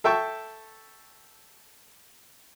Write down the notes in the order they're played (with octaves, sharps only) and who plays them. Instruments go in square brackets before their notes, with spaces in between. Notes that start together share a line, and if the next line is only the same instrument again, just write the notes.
[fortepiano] A4 E5 G5 A5 C#6